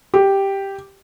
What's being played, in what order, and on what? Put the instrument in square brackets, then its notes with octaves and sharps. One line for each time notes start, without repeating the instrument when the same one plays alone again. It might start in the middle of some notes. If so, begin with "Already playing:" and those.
[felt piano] G4